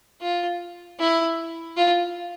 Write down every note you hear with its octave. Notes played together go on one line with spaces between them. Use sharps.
F4
E4
F4